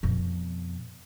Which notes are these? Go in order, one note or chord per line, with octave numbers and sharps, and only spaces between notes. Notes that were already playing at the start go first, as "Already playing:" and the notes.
F2 B2